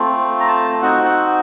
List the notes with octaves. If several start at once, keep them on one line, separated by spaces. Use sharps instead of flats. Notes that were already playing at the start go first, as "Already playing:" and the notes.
Already playing: A3 C4 F4
A#5
A5
C4 D#4 F#4 F#5
F#5